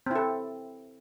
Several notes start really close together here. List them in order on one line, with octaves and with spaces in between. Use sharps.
C4 E4 A4